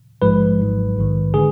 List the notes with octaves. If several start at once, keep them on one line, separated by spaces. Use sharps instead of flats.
A#1 G#2 F3 G#3 B4
G#1 G#2 F#3
A#1 G#2 D#3
D3 G#3 G#4